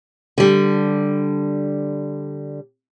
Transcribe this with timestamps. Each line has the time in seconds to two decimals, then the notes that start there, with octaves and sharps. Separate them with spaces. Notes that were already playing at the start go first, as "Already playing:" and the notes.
0.38 D3 G3